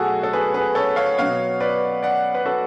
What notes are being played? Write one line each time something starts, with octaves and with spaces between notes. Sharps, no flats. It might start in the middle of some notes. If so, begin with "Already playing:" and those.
Already playing: B2 F#3 A3 F#4 G#4 A4
A4
G#4 B4
G#4 B4
A4 C#5
C#5 F5
B2 F#3 B3 C#5 F5
B4 D5
D5 F#5
B4
F#4 A4